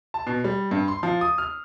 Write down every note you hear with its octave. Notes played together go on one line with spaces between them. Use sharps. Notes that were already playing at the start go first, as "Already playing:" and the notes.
A5
B2
G3
G2
C6
F3
D#6
F6